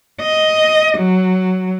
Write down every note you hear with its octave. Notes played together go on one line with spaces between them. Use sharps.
D#5
F#3